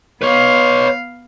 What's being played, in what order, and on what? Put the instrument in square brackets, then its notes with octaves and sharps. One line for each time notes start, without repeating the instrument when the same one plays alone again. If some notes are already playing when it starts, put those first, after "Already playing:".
[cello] B3 F5 [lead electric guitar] B4 C#5